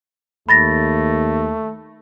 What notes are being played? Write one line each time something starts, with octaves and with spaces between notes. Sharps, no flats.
D#2 A3 B5 A6 A#6